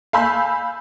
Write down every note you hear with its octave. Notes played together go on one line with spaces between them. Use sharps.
F5 G#5 B5 E6 G6 B6